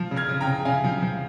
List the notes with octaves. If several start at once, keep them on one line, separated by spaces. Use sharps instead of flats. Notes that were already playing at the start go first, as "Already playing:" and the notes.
Already playing: F3
C#3
F6 G#6
C#3
G5 A#5
C#3
C#3 F5 G#5
F3
F3